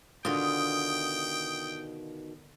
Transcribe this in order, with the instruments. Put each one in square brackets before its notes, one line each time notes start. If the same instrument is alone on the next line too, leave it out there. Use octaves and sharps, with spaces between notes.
[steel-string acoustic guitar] B2 D#3 [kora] D3 F4 [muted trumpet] G5 [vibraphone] D#6